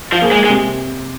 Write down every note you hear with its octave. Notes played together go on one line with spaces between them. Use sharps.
F3
A#3 G#4
G#3
G#3
C3